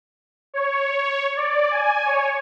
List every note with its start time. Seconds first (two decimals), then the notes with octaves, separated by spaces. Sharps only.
0.54 C#5
1.36 D5
1.71 G#5
2.05 C#5